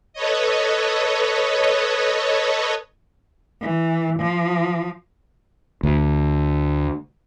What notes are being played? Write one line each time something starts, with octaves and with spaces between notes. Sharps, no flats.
A4 B4 C#5 D#5
E3
F3
D2